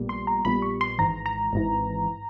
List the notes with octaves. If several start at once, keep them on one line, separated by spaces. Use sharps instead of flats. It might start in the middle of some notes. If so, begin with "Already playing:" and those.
Already playing: A#1 A#2 G3 B3
C6
A#5
A#1 A#2 G3 B3 B5
C#6
C6
G#1 G#2 E3 A#5
A#5
G#1 G#2 E3